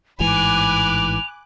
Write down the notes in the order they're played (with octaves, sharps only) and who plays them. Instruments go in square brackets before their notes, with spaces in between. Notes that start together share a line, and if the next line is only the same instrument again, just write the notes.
[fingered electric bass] A1 G#2 E3 [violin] G#5 B5 [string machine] D6 F#6 [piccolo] F7